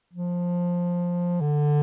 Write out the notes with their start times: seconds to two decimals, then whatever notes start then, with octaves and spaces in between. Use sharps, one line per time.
0.13 F3
1.41 D3